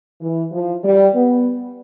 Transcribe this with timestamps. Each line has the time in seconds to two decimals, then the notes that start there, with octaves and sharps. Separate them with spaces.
0.21 E3
0.52 F3
0.84 G3
1.14 B3